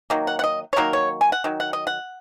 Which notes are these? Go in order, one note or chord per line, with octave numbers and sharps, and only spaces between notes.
D#3 F#3 A#3
F#5
F#5
D#5
C#5
D#3 F#3 A#3 A#4
C#5
G#5
F#5
D#3 F#3
F#5
D#5
F#5